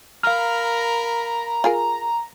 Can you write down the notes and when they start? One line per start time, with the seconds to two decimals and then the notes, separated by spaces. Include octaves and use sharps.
0.23 A#4 F5 A#5 B5 F6
1.64 F4 G#4 A#4